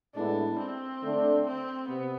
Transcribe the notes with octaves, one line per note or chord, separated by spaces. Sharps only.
A2 G#3 B3 D4 E4
C4
D3 A3 D4
C4
C3 B3